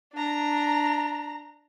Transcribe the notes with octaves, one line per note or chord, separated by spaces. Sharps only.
D4 A#5